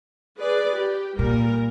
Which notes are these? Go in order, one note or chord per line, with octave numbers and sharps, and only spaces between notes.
G#4 B4 D5
G4
A#2 G3 A#4